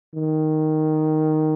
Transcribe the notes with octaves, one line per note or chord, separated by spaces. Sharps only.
D#3